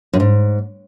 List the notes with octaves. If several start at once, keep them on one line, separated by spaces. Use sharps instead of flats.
F#2
G#2